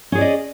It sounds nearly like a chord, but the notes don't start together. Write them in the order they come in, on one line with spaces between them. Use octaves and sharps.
C#4 G#4 D5 D#5